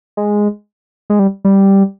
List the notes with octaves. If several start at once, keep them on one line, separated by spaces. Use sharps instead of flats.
G#3
G#3
G3
G3